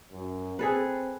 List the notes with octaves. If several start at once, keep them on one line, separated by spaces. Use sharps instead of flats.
F#2
C4 G#4 A4 B4